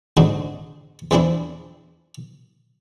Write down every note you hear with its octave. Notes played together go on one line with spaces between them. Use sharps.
G#2 D3 C4 D4 D#4 F#4
E2 E3 F3 C4 D4 E4